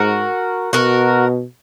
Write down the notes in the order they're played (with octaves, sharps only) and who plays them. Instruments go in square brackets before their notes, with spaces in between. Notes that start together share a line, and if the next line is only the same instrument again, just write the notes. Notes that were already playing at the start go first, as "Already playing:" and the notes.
Already playing: [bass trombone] G#2 [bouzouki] F#4 A#4
[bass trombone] B2 [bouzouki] F#4 A#4